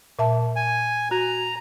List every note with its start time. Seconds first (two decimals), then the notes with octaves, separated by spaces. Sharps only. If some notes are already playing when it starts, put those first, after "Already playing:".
0.19 A#2 E5 A5
0.56 G#5
1.11 F#4 A#5